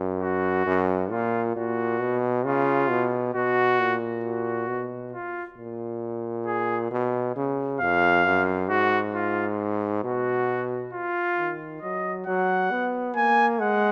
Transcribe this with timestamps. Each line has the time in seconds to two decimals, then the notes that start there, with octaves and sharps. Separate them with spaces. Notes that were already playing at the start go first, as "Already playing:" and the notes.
Already playing: F#2
0.22 F#4
0.67 F#2
1.11 A#2 F4
1.55 A#2 F#4
2.01 B2
2.45 C#3 F4
2.90 B2
3.34 B2 F#4
3.79 A#2
4.24 F#4
4.68 B2
5.13 F4
5.58 A#2
6.46 G#4
6.91 B2
7.36 C#3
7.81 F2 F5
8.25 F#2
8.70 G#2 F#4
9.15 F4
10.04 B2 F#4
10.93 F4
11.38 D#3
11.82 F#3 D#5
12.26 F#3 F#5
12.71 B3
13.16 A#3 G#5
13.61 G#3 F#5